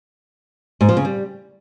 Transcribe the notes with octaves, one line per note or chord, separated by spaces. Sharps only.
G#2
F3
C#3
G3